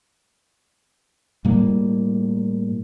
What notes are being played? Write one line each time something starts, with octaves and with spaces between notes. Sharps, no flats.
A2 G3 A#3